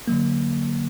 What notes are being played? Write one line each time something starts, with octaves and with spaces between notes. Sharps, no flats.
D3 F#3 A#3